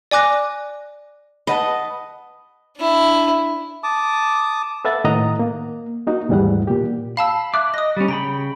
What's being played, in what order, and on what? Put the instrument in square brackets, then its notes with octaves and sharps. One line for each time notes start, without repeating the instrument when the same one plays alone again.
[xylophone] D5 G#5 D6 F#6 A#6
[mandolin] B4 F#5 A5 [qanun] D#5
[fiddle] D4 E4
[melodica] A5 D6 D#6
[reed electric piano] A4 B4 E5 F#5 A6
A2 D#3 D#5 F#5 A#5 D#6
A#3
A#3 D#4 F#4
D#2 G#2 E3 G3 A3 F#5
A#2 G4
[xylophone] F5 A5 E6 [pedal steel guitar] B5
[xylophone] E5 [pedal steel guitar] D6 F#6
[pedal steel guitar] D#5 [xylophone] D#6 A#6
[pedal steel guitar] G3 C#4
[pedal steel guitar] C#3 G5 B5 [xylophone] A#5